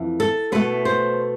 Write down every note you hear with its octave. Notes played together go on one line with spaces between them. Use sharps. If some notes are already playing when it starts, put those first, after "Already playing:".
Already playing: F2 E3 A3
A4
B2 A3 B4
C5